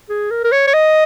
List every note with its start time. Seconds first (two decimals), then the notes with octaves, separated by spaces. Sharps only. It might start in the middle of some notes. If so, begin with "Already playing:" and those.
0.09 G#4
0.31 A#4
0.44 A#4
0.52 C#5
0.68 C#5
0.74 D#5